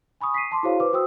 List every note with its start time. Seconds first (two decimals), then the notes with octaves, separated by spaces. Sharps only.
0.21 G#5 B5 C#6 D#6
0.34 B6 C7 D#7
0.51 A5 C6 D6
0.63 E4 F#4 G#4 C5 C#5 F5
0.80 B4 C5 D6
0.93 F#4 C5 G5 D#6 E6